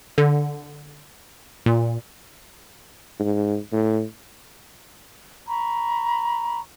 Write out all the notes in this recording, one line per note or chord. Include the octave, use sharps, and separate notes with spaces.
D3
A#2
G#2
A2
A#5 B5 C#6